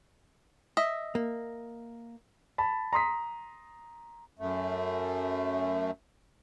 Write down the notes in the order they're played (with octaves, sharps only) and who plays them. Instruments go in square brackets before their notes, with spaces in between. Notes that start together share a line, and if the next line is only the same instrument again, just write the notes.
[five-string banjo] D#5 E5
[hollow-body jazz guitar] A#3
[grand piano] A5 B5
A#5 C6 D#6 B6
[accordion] F#2 A3